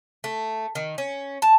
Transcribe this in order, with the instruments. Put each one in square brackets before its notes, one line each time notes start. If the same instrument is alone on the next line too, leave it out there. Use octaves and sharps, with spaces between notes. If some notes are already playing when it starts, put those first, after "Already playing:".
[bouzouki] A3
D#3
C#4
A5